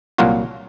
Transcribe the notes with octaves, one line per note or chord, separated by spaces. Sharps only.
C2 A#2 F#3 A#3 F4 F#4